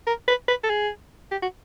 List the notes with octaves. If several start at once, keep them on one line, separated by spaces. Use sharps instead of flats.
A#4
B4
B4
A4
G#4
G4
F#4